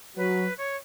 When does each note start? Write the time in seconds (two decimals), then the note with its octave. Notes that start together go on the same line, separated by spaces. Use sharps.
0.16 F#3 B4
0.58 C#5